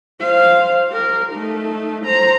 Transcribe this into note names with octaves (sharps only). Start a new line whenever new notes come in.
C5 F5
G4 A#4
A3 D#4
C5 A#5